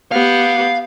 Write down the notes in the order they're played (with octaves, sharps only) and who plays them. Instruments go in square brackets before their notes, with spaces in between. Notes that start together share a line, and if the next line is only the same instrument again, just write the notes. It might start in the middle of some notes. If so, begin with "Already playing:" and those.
[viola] B3 G4 [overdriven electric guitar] F5